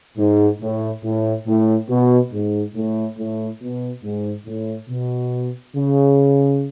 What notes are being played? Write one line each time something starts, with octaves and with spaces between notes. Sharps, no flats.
G#2
A2
A2
A2
B2
G#2
A2
A2
B2
G#2
A2
B2
C#3